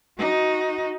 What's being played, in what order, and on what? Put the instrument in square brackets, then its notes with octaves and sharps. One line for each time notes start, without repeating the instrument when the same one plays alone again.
[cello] D#4 F#4